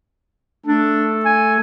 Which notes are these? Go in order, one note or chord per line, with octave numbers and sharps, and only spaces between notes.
A3 D4 A4
G#5